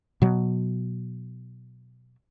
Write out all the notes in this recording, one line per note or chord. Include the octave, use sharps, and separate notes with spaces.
B2 F#3